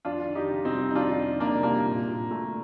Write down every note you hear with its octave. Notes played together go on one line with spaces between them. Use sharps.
F2 D4 F4
D#3
D#4 G4
C3
C4 D#4
G3
D#4
F2 D4 F4
D#3
C3 A#3 D4
G3 A#3 D4
A#2
A#2
A3